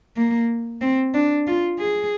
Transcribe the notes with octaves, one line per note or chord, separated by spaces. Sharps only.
A#3
C4
D4
F4
G#4